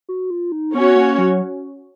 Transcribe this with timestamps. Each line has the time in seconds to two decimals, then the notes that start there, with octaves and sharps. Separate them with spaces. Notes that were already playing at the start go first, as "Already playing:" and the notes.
0.09 F#4
0.30 F4
0.52 D#4
0.74 B3 C#4 F#4 C#5
0.96 A#3
1.18 F#3